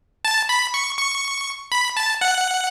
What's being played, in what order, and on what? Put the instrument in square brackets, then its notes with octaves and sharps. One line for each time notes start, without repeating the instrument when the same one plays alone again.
[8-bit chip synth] A5
B5
C#6
C#6
B5
A5
F#5